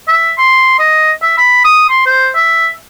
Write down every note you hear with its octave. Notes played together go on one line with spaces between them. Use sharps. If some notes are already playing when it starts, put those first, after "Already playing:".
E5
C6
D#5
E5
B5
D#6
C6
C5
E5